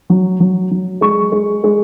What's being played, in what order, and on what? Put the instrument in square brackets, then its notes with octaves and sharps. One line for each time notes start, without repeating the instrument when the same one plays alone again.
[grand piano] F#3
F#3
F#3
G#3 C#6
G#3
G#3